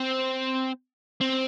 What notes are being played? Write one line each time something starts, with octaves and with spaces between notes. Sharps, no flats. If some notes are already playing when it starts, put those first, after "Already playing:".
Already playing: C4
C4